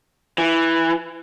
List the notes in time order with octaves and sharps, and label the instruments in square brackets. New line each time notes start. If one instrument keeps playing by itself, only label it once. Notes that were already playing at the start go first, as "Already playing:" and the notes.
[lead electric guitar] E3